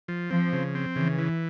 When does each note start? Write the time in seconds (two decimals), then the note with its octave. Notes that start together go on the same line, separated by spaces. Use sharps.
0.08 F3
0.30 F3 C4
0.53 C#3
0.75 C4
0.96 C#3 E3
1.18 E3